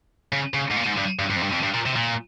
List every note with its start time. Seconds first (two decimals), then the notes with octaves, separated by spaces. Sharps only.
0.33 C#3
0.54 C#3
0.71 G#2
0.76 A#2
0.87 G#2
0.98 G2
1.19 G2
1.30 G2
1.36 F2
1.42 G2
1.52 F2
1.63 G2
1.74 A#2
1.86 C3
1.96 A#2